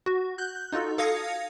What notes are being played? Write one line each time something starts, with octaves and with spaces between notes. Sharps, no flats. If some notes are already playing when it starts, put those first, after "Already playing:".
F#4
F#6 G6
D#4 F4 F#4 A4
A4 F5 D#6 G#6 A#6 C#7